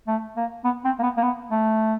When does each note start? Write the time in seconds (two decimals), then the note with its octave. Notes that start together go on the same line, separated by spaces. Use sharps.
0.07 A3
0.36 A#3
0.64 B3
0.85 C4
0.99 A#3
1.03 B3
1.17 A#3
1.22 B3
1.51 A3